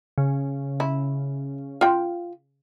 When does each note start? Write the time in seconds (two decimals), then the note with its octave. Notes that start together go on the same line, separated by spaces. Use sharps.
0.18 C#3
0.80 E4
1.81 F4 G5